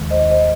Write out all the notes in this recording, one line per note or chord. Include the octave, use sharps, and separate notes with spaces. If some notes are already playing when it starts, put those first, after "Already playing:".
Already playing: D#2 D#3 G#3
C5 D#5
C5 D#5